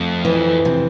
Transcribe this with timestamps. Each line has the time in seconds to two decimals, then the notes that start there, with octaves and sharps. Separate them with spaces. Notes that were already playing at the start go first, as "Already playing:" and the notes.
Already playing: F2 A3
0.25 E3
0.65 C3